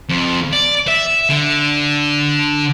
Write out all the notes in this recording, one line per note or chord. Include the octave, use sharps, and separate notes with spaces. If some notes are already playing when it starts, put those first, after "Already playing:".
F2
D5
E5
D3